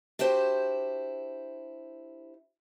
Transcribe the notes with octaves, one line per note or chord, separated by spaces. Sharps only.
D4 E4 F#4 G4 C5